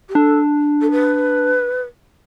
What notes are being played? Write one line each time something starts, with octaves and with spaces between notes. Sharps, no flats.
G4
D4 A4
A4
B4